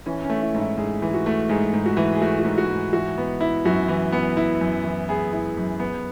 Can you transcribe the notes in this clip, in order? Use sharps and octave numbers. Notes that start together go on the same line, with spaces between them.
E3 C#4
C#4
A3
E4
G#2
E4
G#2 G#4
E3
F#4
A3
G#2 G#4
G#2
F#4
E3
G#4
A3 F#4
F#4
G#2
F#4
G#2
E3 F#4
B3
E4
F#2 F#4
E3
B3
E4
F#2
E3
B3 G#4
E4
F#2
B3